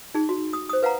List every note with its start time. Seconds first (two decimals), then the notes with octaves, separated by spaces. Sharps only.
0.15 D#4 G#4
0.29 F#4
0.53 D#6
0.69 C5 D#6
0.83 B4 F5 F#5 A#5